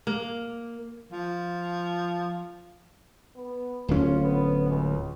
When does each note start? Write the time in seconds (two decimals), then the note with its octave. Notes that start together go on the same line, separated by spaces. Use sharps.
0.07 A#3
1.12 F3
3.36 B3
3.88 D1 C#4 F4
4.23 B3
4.69 C#2